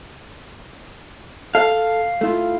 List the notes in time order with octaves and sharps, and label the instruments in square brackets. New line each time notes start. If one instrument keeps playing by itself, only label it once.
[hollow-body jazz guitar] A4 [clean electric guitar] F5
[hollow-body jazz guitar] A3 E4 F4